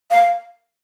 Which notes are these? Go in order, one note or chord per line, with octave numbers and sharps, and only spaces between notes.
F5